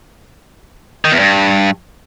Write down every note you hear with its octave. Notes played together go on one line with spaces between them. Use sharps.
D#3
E2
G2